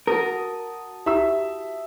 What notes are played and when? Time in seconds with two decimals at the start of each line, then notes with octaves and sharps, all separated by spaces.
0.07 F#4 A#4 A5 D#6
1.06 E4 G4 E5 B5 E6